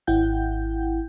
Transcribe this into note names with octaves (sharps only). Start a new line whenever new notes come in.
G#1 E4 F#5 G5 G6